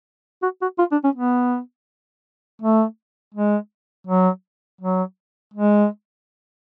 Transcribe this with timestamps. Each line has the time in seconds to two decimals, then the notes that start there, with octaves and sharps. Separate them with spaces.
0.42 F#4
0.61 F#4
0.79 F4
0.91 D4
1.04 C#4
1.15 B3
2.61 A3
3.34 G#3
4.07 F#3
4.81 F#3
5.53 G#3